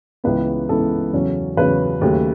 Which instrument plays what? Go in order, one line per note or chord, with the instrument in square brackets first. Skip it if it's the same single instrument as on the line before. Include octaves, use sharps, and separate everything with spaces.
[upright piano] C#2 C#3 E3 B3 B4
C#2 C#3 E3 B3 A4
E2 C#3 F#3 C#4
E2 C#3 F#3 C#4 B4
D#2 C#3 F#3 A3 C#4